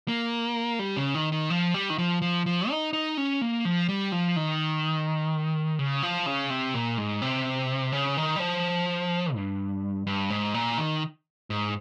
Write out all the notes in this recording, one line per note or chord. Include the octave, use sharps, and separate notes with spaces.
A#3
G3
C#3
D#3
D#3
F3
G3
D#3
F3
F3
F3
D#4
D#4
C#4
A#3
F3
G3
F3
D#3
C#3
F3
C#3
C3
A#2
G#2
C3
C#3
D#3
G3
F3
G2
G2
G#2
A#2
D#3
G#2